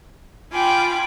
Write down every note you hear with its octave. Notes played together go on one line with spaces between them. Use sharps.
F4 G5 G#5 B5 D6